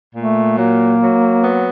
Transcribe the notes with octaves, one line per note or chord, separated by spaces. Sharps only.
A#2 A3
F#3 A#3
F#3
B3